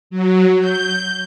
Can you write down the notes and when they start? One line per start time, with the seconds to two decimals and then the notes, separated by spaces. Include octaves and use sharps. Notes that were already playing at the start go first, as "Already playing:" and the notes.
0.10 F#3
0.60 G6